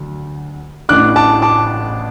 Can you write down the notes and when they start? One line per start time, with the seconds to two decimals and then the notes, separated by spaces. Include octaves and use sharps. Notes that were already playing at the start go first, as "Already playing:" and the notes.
Already playing: D2 D3 F#3
0.89 A1 A2 E3 D4 D6 F#6
1.16 A5 D6
1.42 A5 D6